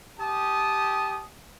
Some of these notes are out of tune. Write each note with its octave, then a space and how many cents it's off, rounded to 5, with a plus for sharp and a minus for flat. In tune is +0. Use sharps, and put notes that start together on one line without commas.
G4 +0 A5 -30 D#6 +0